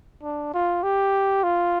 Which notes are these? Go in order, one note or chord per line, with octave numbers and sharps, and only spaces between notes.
D4
F4
G4
F4